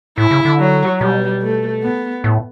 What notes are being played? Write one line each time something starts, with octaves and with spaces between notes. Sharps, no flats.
A2 E4
C#3
D3
F#3
B2 G3
A3
B3
A2